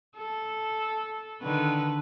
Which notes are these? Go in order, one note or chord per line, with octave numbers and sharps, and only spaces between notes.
A4
D3 D#3 B4